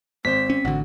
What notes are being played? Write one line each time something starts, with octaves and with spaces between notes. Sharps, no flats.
G#1 C4 C5 B6
C#4
A1 D3 F#4